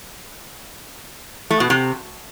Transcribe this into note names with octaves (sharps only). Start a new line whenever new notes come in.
A3
B2
C3